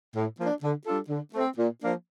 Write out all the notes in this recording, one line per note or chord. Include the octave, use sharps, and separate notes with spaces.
A2
F3 A#3 D4
D3
G3 D4 F4 A4
D3
A3 C4
A#2
F3 A#3 D4